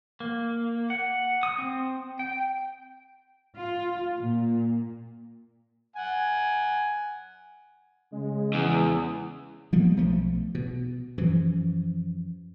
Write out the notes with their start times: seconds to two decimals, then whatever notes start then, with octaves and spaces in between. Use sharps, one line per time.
0.20 A#3
0.90 F#5
1.43 D#6
1.58 C4
2.19 G5
3.57 F4
4.17 A#2
5.96 F#5 G#5
8.12 C#3 G#3
8.53 E2
9.72 F3 G3 A#3 B3
9.97 B1 F3 A3
10.55 B2
11.18 F#2 E3 F3